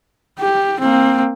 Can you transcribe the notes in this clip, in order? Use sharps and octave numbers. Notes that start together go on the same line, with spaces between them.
G4
A#3 C4